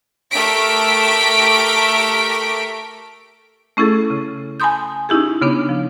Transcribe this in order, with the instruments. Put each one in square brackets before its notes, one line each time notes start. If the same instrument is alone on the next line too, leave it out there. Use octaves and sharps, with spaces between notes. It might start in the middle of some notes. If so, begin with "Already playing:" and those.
[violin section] A3 G4 A#4 B6 D7
[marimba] A3 C#4 E4 G#4 A4
C#3
G#5 A5 B5 C6 D#6 G6
C#4 D#4 E4 G4 G#4
C#3 B3 D4
F3